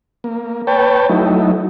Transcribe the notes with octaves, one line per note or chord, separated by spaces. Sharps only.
A#3
B4 C#5 G5 A5
F#3 A3 D#4 E4